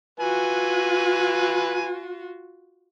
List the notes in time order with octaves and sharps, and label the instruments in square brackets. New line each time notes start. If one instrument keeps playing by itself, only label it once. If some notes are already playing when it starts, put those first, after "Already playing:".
[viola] F4 F#4 [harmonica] B4 G#5